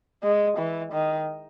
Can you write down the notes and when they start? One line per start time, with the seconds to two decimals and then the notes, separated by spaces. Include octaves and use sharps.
0.23 G#3
0.58 E3
0.92 D#3